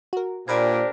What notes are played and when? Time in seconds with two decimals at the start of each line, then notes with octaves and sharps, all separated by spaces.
0.13 F#4 A#4
0.48 A#2 D4 G4 A#4 C5 D5 B5 G#6